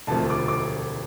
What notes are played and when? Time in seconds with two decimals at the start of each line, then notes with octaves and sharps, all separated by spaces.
0.07 E1 D2 C3 F3 A3 A5
0.30 D6
0.48 D6